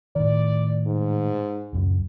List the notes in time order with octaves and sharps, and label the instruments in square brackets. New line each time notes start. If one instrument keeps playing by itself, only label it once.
[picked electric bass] A2 D#3 [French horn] D5
[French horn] G#2
[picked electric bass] D1 C#2 F#2